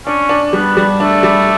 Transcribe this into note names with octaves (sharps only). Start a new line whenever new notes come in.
C#4 D4
D4
G3 B3
G3
A3 D4
G3